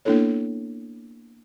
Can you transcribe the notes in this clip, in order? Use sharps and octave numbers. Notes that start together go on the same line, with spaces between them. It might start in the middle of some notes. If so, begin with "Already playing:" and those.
A#3 B3 D4 E4 A4 C#5